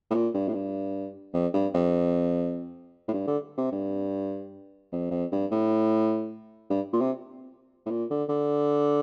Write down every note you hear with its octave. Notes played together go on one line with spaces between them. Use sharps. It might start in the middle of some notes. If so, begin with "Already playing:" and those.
A2
A#2
G2
A2
G2
F2
G2
F2
A2
G2
D3
C3
G2
F2
F2
G2
A2
G2
A#2
C3
A2
A#2
D3
D3